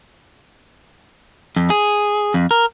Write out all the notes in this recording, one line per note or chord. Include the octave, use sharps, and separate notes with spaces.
F2
G#4
F2
A#4